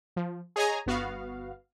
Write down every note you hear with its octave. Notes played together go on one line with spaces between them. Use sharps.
F3
G#4 C#5 D#5 G#5 A#5
G1 B3 F#4 F5